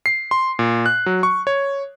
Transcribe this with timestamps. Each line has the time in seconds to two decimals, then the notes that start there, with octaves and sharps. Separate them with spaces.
0.06 C7
0.31 C6
0.59 A#2
0.86 F#6
1.06 F#3
1.23 C#6
1.47 C#5